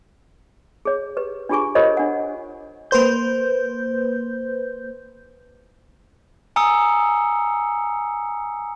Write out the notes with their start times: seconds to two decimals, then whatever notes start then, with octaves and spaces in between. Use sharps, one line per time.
0.85 G#4 C#5
1.17 G4 B4
1.49 D4 F4 G4 G#4 G#5 C#6
1.75 F4 G4 A#4 C5 C#5 D#5
1.97 D4 F#5
2.91 A#3 B4 C5 G6
6.56 G#5 A#5 D#6 E6 C#7